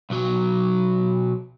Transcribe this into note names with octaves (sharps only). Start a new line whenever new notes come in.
B1 F#3